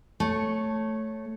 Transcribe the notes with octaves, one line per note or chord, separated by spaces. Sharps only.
A3 C#5